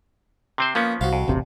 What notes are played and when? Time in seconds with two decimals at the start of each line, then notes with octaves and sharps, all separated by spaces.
0.58 C3 C4 C5
0.75 F3 A#3 B3 C#4
1.01 C2 F#4 C5 F5
1.13 F2
1.28 E1 A1 C3